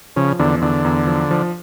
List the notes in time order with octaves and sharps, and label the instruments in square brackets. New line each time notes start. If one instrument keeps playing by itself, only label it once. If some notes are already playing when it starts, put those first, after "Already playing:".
[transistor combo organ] C#3 [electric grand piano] F3
[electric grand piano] E2 [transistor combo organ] D3
[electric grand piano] E2 [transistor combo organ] D3
[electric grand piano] E2
F3
F3